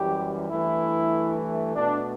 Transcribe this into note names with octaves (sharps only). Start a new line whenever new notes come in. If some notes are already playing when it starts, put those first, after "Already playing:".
Already playing: F#2 E3 G3 G4
G2 E3 A3 E4
B2 A3 D4